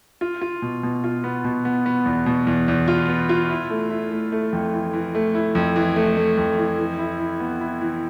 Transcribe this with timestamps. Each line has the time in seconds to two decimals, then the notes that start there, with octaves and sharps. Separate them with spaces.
0.21 F4
0.41 F4
0.62 B2
0.83 B2
1.04 F4
1.24 B3
1.44 B2
1.65 B3
1.86 B3
2.06 E2
2.26 B2
2.47 E2
2.68 E2
2.88 F4
3.08 B3
3.29 F4
3.50 E4
3.70 A3
3.91 E4
4.11 A3
4.32 A3
4.53 F2
4.73 E3
4.93 E3
5.15 A3
5.35 E4
5.55 F2
5.76 E3
5.96 A3
6.17 A3
6.37 F2
6.59 E3
6.79 E3
6.99 E4
7.20 E4
7.40 B3
7.61 E4
7.81 E3